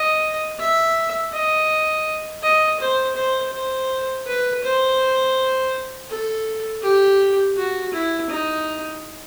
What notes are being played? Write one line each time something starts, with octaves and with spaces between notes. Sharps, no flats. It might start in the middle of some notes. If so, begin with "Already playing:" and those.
Already playing: D#5
E5
D#5
D#5
C5
C5
C5
B4
C5
A4
G4
F#4
E4
D#4